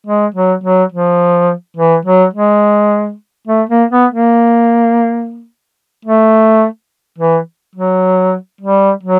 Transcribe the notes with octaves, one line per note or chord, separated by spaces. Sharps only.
G#3
F#3
F#3
F3
E3
F#3
G#3
A3
A#3
B3
A#3
A3
E3
F#3
G3
F#3